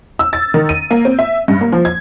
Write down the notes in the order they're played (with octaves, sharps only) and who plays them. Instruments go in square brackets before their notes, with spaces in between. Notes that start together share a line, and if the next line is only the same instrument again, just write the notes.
[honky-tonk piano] E6
A6
D#3
D#7
A#3
C4
E5
G2
A#3
F3
G#6